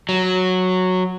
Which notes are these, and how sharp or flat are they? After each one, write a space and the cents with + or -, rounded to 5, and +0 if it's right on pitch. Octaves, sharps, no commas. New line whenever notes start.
F#3 -5